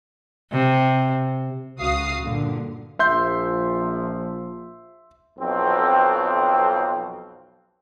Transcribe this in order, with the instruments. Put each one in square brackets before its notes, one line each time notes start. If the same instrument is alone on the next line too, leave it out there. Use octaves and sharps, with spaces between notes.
[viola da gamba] C3
[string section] C#2 C#3 F#4 F5 D#6 C7
G2 A#2 D3
[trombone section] A#1 F3 [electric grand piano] E5 C6 G6
[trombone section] B1 F2 C4